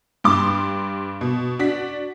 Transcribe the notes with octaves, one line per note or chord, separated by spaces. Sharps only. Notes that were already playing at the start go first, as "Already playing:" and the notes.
G2 G3 C6 D6
B2
D4 F#4 B6